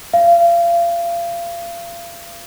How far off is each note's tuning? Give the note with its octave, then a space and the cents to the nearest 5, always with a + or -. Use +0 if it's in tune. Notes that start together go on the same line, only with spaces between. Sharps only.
F5 -35